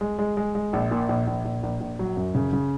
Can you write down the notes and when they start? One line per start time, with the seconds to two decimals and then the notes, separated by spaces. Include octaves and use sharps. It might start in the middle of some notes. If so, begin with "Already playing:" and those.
0.01 G#3
0.19 G#3
0.37 G#3
0.55 G#3
0.73 A#1
0.91 A#2
1.09 A#1
1.27 A#1
1.45 A#1
1.63 A#1
1.81 A#1
1.99 F#3
2.17 F#2
2.35 C#3
2.53 C#3